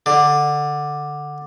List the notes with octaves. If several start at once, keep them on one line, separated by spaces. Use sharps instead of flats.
D3